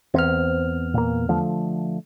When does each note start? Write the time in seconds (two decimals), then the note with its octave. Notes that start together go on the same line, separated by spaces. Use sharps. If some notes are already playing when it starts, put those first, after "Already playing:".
0.14 E2 B3 C4 F6
0.94 A#2 A#3
1.28 D3 F3 A3